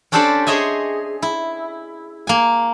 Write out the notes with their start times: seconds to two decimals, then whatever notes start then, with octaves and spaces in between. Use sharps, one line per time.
0.12 C#4 D4 G4 A4 C5 D5
0.47 G#4 C5 C#5 D#5 E5 G#5
1.22 E4
2.27 A#3 G#5